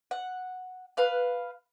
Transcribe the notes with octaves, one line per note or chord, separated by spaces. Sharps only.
F#5
B4 F5 F#6